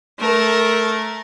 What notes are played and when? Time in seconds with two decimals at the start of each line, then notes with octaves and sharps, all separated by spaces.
0.19 A3 A#4